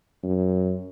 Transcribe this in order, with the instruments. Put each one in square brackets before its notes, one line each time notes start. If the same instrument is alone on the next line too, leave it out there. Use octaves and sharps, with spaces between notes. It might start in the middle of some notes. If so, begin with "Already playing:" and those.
[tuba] F#2